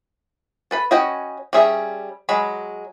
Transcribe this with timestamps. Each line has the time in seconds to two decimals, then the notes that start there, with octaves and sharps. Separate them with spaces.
0.71 A4 B4 B5
0.91 C#4 F#4 B4 D#5 G5
1.53 G3 C#4 G#4 E5
2.29 F#3 G#3 B5